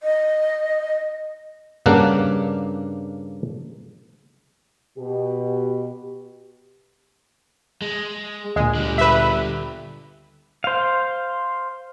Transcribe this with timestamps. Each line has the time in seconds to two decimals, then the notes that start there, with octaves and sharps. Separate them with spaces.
0.03 D#5
1.86 G2 C#3 A#3 D4 F#5
4.98 B2 G4
7.82 G#3
8.56 D2 A#2 G#3
8.75 D3 G3
8.98 B4 E5
10.64 C5 F5